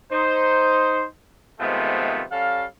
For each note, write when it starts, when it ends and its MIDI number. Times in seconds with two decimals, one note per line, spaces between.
0.12 1.05 63
0.12 1.05 72
1.60 2.22 48
1.60 2.22 51
1.60 2.22 53
1.60 2.22 56
1.60 2.22 57
1.60 2.22 59
2.31 2.64 55
2.31 2.64 61
2.31 2.64 69
2.31 2.64 77